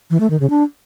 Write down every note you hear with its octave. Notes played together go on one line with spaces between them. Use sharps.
E3
A3
D#3
C#3
D4